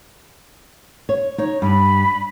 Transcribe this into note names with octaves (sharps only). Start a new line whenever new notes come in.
C#5
D#4 C#5
G2 B5